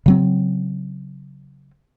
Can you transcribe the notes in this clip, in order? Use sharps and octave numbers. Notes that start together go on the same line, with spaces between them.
C#3 F#3 C4